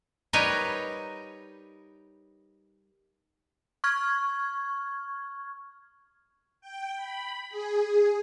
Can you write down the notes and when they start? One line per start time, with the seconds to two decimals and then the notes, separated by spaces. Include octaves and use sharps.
0.33 G3 D#4 A#4 B4 C#5 D#5
3.84 C#6 F6 G#6
6.61 G5
6.96 B5
7.50 G#4